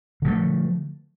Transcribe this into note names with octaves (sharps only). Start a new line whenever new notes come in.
D3 F3 A3